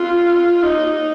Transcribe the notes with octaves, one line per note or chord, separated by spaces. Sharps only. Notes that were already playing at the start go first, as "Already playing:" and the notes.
Already playing: F4
D#4